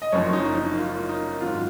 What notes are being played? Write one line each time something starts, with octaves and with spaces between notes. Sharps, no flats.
D#5
F#1 F#2 F3 C#5
D#4
D#4
F4
D#4
G#2 D#3 F#3 F4